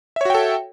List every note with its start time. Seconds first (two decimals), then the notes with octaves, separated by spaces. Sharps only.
0.16 E5
0.21 C#5
0.25 F#4
0.30 G5
0.35 A4